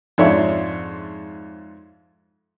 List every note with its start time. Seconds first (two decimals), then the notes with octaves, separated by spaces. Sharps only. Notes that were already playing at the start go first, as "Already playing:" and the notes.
0.18 F2 G#2 D4 C#5 E5